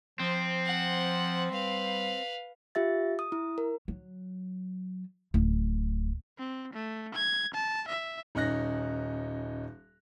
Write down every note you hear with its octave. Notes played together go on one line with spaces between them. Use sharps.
F3 C4
F#5
G3 B4 F5
F4 G4 E5 A6
D#6
E4
A#4
F#3
D1
C4
A3
G#6
A5
E5
D#1 C#4 D#4 F#6 A#6